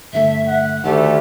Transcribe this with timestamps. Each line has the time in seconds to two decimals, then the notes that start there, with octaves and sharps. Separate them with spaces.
0.13 G2 D3 A3 E5
0.47 F#5
0.84 D2 D#3 A3 G4